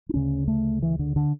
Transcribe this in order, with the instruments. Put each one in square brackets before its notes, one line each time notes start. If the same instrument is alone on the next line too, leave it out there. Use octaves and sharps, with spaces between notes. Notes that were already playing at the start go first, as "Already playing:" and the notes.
[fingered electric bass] D4
D2 C#3 C#4
A3
E3
D3
D3